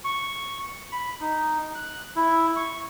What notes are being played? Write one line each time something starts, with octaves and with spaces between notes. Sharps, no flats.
C#6
B5
D#4
F#6
E4
C#6